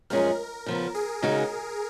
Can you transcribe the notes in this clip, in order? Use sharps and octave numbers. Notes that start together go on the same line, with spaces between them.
F#2 F3 G#3 C#4 G#4 A#4
C#3 F3 B3
G#4
C#3 G#3 D#4 F#4